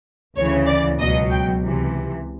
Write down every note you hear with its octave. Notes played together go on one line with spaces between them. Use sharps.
D2 C#3 E3 C#5
D5
C#2 B2 F#3 D#5
G5
C#2 C3 E3